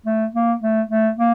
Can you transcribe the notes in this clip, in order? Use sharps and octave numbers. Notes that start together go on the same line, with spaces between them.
A3
A#3
A3
A3
A#3